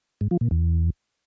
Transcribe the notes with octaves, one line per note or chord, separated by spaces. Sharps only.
G#2
F3
A#2
E2